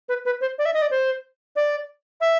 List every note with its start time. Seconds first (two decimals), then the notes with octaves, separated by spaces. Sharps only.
0.09 B4
0.25 B4
0.41 C5
0.58 D5
0.65 E5
0.74 D#5
0.82 D5
0.91 C5
1.56 D5
2.21 E5